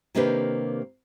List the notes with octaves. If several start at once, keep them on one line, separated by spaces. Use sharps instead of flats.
C3 D#3 A#3 D4 G4 B4